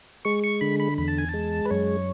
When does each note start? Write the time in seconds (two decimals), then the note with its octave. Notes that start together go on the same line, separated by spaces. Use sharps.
0.25 G#3 C#6
0.44 C#6
0.61 D3 B5
0.80 B5
0.98 E2 B5
1.08 A5
1.18 G#5
1.29 A5
1.34 G#3
1.65 B4
1.71 F#2 C#5